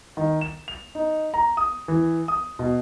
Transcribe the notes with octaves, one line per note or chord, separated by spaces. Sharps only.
D#3
E7
F7
D#4
A#5
D#6
E3
D#6
B2